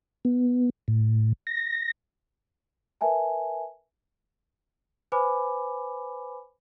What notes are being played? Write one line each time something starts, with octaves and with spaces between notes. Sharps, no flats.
B3
A2
A#6
A#4 B4 E5 G#5 A5
B4 C5 G#5 B5 D6